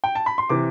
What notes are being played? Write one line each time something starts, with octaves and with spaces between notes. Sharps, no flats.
G5
A5
B5
C6
C3 E3 D6